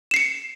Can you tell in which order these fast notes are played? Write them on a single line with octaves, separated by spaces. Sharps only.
E7 C7 C#7